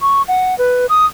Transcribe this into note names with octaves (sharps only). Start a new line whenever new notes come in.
C#6
F#5
B4
D#6